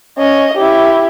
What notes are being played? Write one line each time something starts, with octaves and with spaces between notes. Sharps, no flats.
C#4 D#5
E4 G4